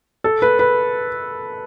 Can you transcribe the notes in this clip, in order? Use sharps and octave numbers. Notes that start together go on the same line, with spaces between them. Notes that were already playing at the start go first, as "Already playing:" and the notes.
A4
B4
B4